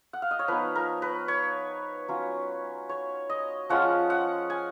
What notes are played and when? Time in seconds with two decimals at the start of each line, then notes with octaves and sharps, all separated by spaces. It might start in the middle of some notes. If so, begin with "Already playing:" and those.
0.13 F#5
0.22 F5
0.31 D#5
0.39 C#5
0.48 F3 B3 D#4 B4
0.76 A#4
1.02 B4
1.28 C#5
2.09 F#3 C#4 F4
2.89 C#5
3.30 D#5
3.69 F3 G#3 C#4 F4 F#5
4.10 F#5
4.50 G#5